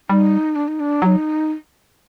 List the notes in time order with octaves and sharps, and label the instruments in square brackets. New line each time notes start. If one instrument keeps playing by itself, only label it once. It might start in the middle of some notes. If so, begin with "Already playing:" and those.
[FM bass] G3 [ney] D#4
[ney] D4
D#4
D4
[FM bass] F#3 [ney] G4
[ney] D#4